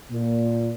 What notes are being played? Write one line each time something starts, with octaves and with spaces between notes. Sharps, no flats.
A#2